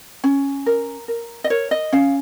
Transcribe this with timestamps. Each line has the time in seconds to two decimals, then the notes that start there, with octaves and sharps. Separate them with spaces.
0.24 C#4
0.66 A#4
1.08 A#4
1.44 D#5
1.50 A#4 C#5
1.71 D#5
1.92 C#4 F5